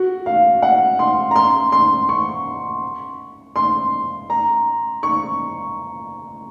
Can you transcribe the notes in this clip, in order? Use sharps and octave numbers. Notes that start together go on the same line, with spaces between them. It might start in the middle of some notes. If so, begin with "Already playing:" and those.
Already playing: F#4
F5
F#5
C6
A#5
C6
C6
C#6
C6
A#5
C#6